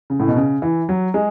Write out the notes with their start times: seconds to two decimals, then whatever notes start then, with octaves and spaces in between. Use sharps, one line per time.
0.10 C#3
0.20 A2
0.28 B2
0.36 C#3
0.62 E3
0.89 F#3
1.14 G#3